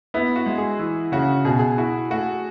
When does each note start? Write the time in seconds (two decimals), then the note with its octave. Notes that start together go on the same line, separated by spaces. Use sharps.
0.14 B3 E4
0.36 F#4
0.46 G#3
0.58 G#4
0.79 E3
1.12 C#3 F#4
1.45 B2 G#4
1.59 G#4
1.78 E4 F#4
2.10 A3 F#4